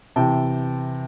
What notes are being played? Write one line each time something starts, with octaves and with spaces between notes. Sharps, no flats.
C3 E3 G5 A5